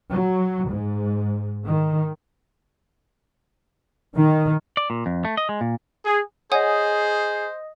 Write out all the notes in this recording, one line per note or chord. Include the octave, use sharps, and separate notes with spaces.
F#3
G#2
D#3
D#3
D5
A#2
F2
A3
D#5
G#3
A#2
G#4
G#4 C5 C#5 D#5 F#5 G#5 D#6